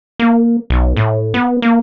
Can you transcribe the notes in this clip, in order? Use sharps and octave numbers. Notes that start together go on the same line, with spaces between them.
A#3
B1
A2
B3
A#3